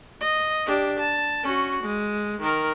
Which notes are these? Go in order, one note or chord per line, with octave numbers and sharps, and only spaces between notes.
D#5
D4 G4
A5
C#4 F#4
G#3
D#3 A#4